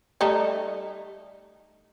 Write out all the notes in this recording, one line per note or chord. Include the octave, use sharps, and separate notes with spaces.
G3 A3 D#4